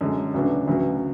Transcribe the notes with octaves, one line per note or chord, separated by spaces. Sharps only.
F#2 D3 G#3
D2 C#3 F#3 B3 D4
D2 C#3 F#3 B3